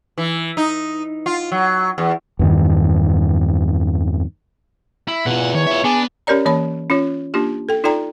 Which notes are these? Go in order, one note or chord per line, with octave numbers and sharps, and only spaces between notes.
E3
D#4
F4
F#3
E2
E2 G2 D#3
E4
E2 B2 F4 F#5
D#3 C#5
F4 E5
B3 D4 G#4
C#4 G4 A#4 C#5 D5 A#5
E3 A#3 C#5 B5
C#4 F4 C#5
A#3 D4 F4 G4
A4 G5
D#4 F4 A4 D5 G5 A#5